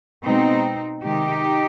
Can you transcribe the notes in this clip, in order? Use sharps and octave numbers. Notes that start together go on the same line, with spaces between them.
B2 G#3 C4 D#4
C3 D#3 G#3 D#4 G4